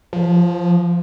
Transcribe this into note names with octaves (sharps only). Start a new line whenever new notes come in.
F3